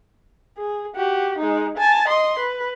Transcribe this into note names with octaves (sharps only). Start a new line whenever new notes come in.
G#4
F#4 G4
G#3 D#4
G#5 A5
D#5 C6
B4